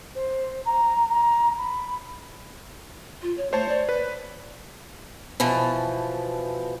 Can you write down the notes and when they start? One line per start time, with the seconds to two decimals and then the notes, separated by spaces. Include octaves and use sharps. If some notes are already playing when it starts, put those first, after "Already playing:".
0.15 C5
0.65 A#5
1.09 A#5
1.58 B5
3.22 F4
3.37 C#5
3.53 A3 C5 C#5 A5
3.69 D5
3.89 B4
5.40 B2 E3 F3